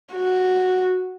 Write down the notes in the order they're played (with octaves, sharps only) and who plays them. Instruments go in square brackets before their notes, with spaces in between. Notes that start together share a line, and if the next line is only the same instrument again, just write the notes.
[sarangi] F#4